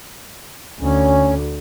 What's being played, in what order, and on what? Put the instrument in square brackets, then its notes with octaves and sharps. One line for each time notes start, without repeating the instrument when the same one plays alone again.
[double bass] D2 [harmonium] C#4